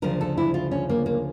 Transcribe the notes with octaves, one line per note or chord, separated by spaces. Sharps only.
D2 C#3 F3 A#4
A4
E4
F4
C#4
A#3
A#3